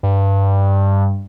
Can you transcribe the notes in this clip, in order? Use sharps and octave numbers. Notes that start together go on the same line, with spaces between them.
G2